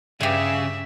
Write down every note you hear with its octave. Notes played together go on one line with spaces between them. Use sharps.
G2 C#3 G4 G#4 E5